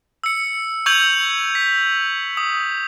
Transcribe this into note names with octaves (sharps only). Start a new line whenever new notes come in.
E6 C#7
C#6 E6 G6 G#6 F7 F#7
B6
D#6